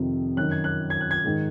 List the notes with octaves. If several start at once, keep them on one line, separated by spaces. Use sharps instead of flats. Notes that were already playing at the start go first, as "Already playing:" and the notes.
Already playing: F2 C3 D#3
F#2 D#3 F#6
G#6
F#6
G#6
F#6
G#6
G#2 D#3